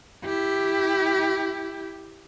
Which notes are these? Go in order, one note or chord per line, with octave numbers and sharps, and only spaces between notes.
E4 G4